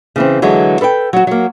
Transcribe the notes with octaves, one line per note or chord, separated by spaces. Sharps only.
C#3 E3 C4
D3 E3 F#3 G#3
A4 B4 D#5 G5
F#3 F#4
F#3 A#3